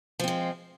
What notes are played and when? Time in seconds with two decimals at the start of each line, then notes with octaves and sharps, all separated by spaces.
0.19 F3
0.24 C4
0.28 G#3